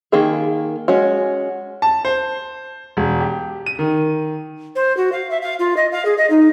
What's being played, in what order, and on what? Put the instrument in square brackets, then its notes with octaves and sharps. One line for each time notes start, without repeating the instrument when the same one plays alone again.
[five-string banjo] D#3 A#3 G#4
G#3 C#4 F#4
[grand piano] A5
C5
E1
G4
D#7
D#3
[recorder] C5
F#4
F5
E5
F5
F4
D#5
F5
G#4
D#5
D#4